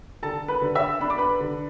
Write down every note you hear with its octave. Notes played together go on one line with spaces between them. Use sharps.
D3 A4 A5
B4 B5
D3
E5 E6
D4 B5
D6
B4 B5
D3